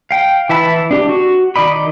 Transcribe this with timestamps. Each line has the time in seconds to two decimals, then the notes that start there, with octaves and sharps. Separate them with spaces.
0.11 F5 G5
0.49 E3 E4 E5 A5 B5
0.91 D4 G4
1.09 F#4
1.56 D#3 D5 D#5 B5